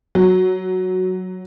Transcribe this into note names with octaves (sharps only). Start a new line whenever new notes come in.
F#3